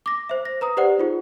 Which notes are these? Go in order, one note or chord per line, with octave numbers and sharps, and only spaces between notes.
D6 A#6
C5 E5
A#6
B4 A#5 D#6
G4 B4 C5 D5 F#5
D#4 F4 G#4